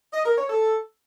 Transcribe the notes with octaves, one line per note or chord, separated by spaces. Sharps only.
D#5
A#4
C#5
A4